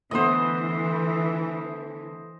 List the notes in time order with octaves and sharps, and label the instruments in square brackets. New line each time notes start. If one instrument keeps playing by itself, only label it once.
[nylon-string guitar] D3 A3 B3 [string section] E3 [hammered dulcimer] C5 D#5